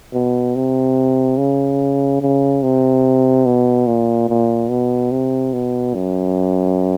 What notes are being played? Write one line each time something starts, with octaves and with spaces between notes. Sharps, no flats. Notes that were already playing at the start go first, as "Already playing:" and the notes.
B2
C3
C#3
C#3
C3
B2
A#2
A#2
B2
C3
B2
F#2